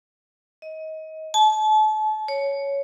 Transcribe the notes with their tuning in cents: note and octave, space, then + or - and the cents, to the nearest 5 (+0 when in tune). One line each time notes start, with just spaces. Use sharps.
D#5 +25
A5 -35
C#5 +5